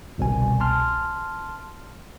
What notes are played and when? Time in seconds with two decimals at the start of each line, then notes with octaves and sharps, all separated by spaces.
0.18 G1 C2 B2 G#5
0.60 A5 C6 F6